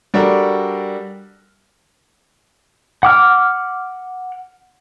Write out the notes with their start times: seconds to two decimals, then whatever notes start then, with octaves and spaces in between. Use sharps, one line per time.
0.14 G3 D4 F#4 A4 A#4
3.03 F#5 D6 F6